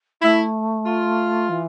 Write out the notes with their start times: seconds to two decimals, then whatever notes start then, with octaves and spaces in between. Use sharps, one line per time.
0.22 A3 E4
0.86 F4
1.49 E3